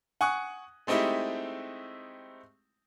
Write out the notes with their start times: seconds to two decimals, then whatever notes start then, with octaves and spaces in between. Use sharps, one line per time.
0.21 F#5 G#5 C#6 D#6 F#6
0.87 G#3 A3 C4 D#4 E4 G4